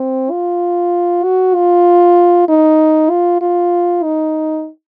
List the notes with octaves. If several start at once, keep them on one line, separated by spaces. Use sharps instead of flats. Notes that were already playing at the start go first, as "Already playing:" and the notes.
Already playing: C4
F4
F#4
F4
D#4
F4
F4
D#4